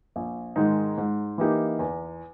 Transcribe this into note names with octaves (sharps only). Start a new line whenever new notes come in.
A#1
G#2 D#3 G#3 D#4
G#2
E3 A#3 D#4 G4
E2